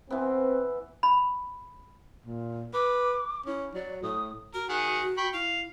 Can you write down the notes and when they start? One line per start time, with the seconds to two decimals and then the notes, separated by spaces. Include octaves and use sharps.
0.10 E3 B3 C4
1.03 B5
2.26 A#2
2.74 B4 D6
3.46 C#4 E4
3.75 F#3 D5
4.03 A2 D#6
4.54 F#4 A#4
4.69 D#3 G#4 F#5
5.17 G5 B5 C#6
5.33 E4 F5